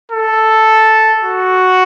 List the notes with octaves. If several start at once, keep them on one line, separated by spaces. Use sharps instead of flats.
A4
F#4